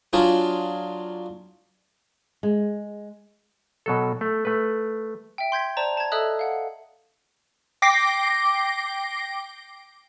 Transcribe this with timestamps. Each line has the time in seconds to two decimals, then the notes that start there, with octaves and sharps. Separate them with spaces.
0.13 F#3 D4 F4 G#4
2.43 G#3
3.86 B2 F#3 A4
4.21 A3
4.45 A3 B4
5.38 E5 G5
5.52 C6 G6 G#6 B6
5.77 C5 D5 A5 A#5
5.97 A5 G#6
6.12 A4 D#5 E5 D#6 F#6
6.39 F5 F#5
7.82 G5 D6 A#6 C7